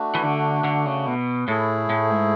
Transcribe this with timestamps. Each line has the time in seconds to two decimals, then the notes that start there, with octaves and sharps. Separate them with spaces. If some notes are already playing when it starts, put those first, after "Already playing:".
Already playing: A3 D4 F#4
0.15 E3
0.23 D3
0.64 D3
0.86 C#3
1.06 B2
1.48 A2 A3 E4 G#4
1.90 A2
2.11 G#2